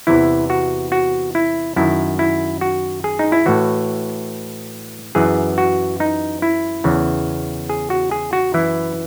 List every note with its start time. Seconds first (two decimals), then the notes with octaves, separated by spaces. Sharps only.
0.07 E2 C3 E3 E4
0.50 F#4
0.92 F#4
1.35 E4
1.76 F#2 D#3 E4
2.19 E4
2.61 F#4
3.04 G#4
3.19 D#4
3.32 E4
3.46 A2 E3 F#4
5.15 F#2 E3 G#4
5.58 F#4
6.00 D#4
6.42 E4
6.84 E2 C#3 E3
7.69 G#4
7.90 F#4
8.11 G#4
8.33 F#4
8.54 F#2 E3 E4